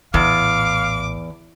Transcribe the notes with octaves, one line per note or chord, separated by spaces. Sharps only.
A#1 E2 A2 F5 D6